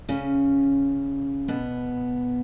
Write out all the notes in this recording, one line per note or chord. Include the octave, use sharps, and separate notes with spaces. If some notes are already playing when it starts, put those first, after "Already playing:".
C#3 C#4
B2 B3